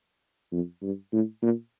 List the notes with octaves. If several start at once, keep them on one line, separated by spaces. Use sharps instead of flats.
F2
G2
A2
A#2